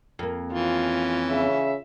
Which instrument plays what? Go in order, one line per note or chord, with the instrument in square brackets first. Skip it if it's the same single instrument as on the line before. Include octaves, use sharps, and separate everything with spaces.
[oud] F2 A#3
[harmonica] E3 C#4 [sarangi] F4
[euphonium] C#3 [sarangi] E5